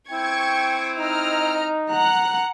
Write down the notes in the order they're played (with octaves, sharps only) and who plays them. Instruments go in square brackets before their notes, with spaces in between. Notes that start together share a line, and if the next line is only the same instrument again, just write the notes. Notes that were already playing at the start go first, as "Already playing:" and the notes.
[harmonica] C4 E4 [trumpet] G5 [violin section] C#6 G#6
[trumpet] D#4 [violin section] D#5 A#5 F6
[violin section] F#5 F#6 [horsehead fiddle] A#5